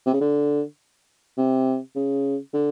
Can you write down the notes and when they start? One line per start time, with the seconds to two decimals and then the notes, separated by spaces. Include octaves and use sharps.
0.06 C3
0.14 C#3
0.21 D3
1.38 C3
1.96 C#3
2.54 D3